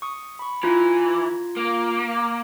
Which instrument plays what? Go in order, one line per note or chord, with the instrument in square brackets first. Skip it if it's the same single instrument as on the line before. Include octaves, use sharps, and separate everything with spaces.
[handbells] C#6 D#6
B5 C#6
[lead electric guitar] E3 [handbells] F4 A#5 G#6
[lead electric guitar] A#3